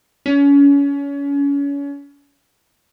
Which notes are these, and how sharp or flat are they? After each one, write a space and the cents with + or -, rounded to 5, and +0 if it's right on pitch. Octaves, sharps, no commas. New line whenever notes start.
C#4 +30